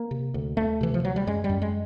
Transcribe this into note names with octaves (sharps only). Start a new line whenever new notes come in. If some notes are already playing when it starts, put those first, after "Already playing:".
Already playing: A#3
C3
D2
D2 A3
C3 E3
F3
D2 F#3
G3
F#2 G#3
G3
F#2
G#3